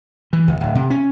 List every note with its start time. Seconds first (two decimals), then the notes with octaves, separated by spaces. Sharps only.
0.33 E3
0.48 C#2
0.61 D1
0.75 C3
0.90 C#4